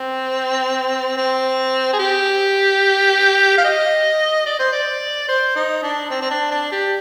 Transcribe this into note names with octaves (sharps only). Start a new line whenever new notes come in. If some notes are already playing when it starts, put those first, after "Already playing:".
Already playing: C4
C4
G#4
G4
F5
D#5
D5
C5
D5
C5
D#4
D4
C4
C4
D4
D4
G4